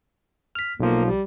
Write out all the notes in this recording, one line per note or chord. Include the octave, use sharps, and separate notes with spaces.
F6 B6
B1 F3 A#3
G3